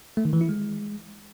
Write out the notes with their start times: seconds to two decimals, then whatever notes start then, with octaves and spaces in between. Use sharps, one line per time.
0.17 A3
0.25 D#3
0.33 E3
0.41 E4
0.49 G#3